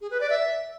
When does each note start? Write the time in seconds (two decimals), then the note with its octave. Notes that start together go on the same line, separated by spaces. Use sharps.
0.01 G#4
0.11 B4
0.20 D5
0.30 E5